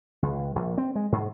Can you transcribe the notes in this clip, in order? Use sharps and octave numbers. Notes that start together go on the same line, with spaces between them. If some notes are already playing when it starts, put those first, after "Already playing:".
C#2
A#1
C4
G#3
G#2